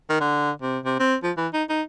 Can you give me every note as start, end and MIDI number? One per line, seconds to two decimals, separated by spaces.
0.10 0.21 51
0.21 0.51 50
0.62 0.79 48
0.85 0.97 48
1.00 1.16 60
1.24 1.32 53
1.37 1.48 52
1.54 1.63 63
1.69 1.82 63